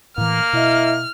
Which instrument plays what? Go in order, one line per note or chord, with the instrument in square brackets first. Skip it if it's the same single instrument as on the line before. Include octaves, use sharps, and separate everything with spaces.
[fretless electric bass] A2 E3 [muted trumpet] A#3 [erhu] F6
[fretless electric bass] B2 [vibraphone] E4 D#5 E5